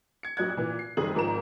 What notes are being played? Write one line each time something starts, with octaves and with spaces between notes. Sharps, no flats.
G#6 C#7
A#1 A#2 F#3 D#5 F#6 G#6
A#2 E3
C7
F#1 D#3 G3 G#4 D#6 F#7
G#1 G#2 F3 A#4 A#5 E7